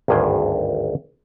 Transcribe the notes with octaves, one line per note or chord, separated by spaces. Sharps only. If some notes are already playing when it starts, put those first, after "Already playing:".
G#1 D2 G2 G#4 C5 G5